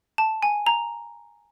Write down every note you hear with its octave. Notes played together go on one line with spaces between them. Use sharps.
A5
G#5
A#5